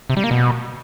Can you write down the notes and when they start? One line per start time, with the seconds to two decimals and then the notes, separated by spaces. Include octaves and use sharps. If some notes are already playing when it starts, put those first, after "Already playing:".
0.10 C3
0.17 G3
0.24 A#3
0.31 B2